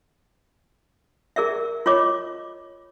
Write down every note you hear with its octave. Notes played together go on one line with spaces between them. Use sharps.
G#4 A#4 D5 E5
F4 C#5 D#5 D6